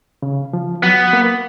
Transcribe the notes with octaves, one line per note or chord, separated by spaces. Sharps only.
C#3
F3
F#3 B3
A#3